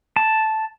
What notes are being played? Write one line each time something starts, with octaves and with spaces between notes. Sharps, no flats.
A5